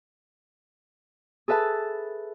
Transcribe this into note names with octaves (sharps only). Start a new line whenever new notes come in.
G#4 A4 B4 E5 A5